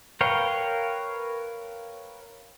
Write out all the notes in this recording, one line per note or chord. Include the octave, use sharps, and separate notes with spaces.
A#4 B4 C#5 F5 G5